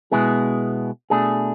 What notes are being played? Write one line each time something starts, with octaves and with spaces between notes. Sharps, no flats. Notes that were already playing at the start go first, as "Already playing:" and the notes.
B2 G#3 B3 E4 G#4
B2 A3 D4 G#4